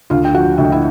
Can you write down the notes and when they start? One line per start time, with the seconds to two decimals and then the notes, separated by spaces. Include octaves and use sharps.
0.10 D2 F4 F5
0.25 G5
0.34 F3 F#4 F#5
0.58 D2 E5
0.65 D#5
0.72 E4 E5